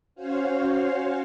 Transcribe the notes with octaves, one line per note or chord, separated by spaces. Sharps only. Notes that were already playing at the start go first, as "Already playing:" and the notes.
C#4 F#4 C5 C#5 F5